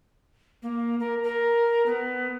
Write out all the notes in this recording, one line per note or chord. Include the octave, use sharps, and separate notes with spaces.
A#3
A#4
A#4
B3